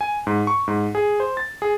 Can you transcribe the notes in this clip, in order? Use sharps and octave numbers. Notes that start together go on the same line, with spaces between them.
G#5
G#2
C#6
G#2
G#4
C5
A6
G#4